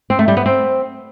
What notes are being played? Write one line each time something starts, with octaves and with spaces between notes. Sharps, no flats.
C4
A3
G3
B3
C4